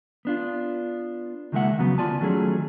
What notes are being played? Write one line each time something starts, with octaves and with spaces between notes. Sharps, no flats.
B3 D4 F4
C#2 D#3 G#3 A#3 E5 F#5
D#2 C#3 F#3 B3
D2 G3 F4 D5 G#5 A5
D#3 F#3 A3 C#4 G#4